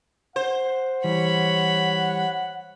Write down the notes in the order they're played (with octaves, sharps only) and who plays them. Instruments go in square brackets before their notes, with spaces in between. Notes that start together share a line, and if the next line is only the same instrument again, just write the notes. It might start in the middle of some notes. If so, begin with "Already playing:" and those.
[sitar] C5 [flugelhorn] F#5
[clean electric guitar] E3 G3 [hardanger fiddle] C#5 B5